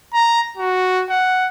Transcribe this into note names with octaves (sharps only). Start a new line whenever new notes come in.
A#5
F#4
F#5